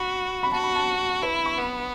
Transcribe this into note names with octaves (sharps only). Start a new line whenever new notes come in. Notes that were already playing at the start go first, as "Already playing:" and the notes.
Already playing: F#4 B5
B5
F#4 A5
B5
A5
E4 B4
B5
C#6
B3 B5